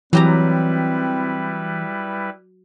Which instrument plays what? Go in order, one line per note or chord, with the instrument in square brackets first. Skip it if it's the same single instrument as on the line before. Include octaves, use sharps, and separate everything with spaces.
[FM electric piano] E3 [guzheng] F#3 G4 A#5 [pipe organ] G3 E4 B4 [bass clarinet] C4